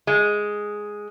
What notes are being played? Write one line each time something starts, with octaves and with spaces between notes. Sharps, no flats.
G#3